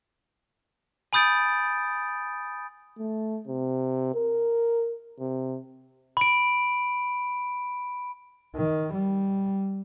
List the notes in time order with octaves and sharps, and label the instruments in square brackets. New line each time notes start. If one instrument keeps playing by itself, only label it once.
[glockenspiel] G#5 B5 D#6 G6 A6 D7
[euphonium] A3
C3
A#4
C3
[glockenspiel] B5 D7
[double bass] D#3
G3